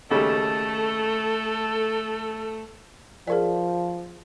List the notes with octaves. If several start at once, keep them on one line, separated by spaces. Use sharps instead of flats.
D#2 C#3 G3 A3 A4
F3 G#4 A#4 D5